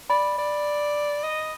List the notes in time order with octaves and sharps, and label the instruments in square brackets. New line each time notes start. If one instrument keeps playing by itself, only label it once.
[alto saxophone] D5 [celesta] B5
[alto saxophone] D5
D#5